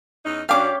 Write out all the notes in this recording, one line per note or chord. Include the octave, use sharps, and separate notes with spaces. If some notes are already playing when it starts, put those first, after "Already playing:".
E2 C#4 D#4
F#2 F#3 C#4 D4 G4 F5 D6